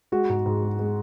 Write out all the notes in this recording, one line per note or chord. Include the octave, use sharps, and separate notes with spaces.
G#3 F#4
G#2
G#2
G#3
G#3